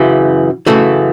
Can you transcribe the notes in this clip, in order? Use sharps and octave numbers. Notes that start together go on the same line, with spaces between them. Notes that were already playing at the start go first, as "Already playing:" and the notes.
Already playing: F#2 C#3 E3
F#2 C#3 E3 A3